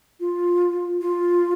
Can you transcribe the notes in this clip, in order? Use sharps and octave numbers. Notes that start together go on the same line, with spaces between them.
F4
F4